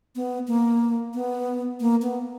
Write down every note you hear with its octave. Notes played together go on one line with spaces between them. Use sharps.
B3
A#3
B3
A#3
B3